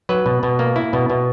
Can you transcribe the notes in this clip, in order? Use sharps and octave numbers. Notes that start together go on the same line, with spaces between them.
F#3 B4
B2
B2
A#3
E4
B2
B2